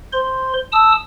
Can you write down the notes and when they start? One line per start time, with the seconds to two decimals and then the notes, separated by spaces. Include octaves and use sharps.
0.13 C5 C6
0.72 A5 D#6 E6